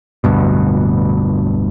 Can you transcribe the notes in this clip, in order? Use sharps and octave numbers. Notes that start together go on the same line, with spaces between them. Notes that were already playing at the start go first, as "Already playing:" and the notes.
D1 D2 G2 B2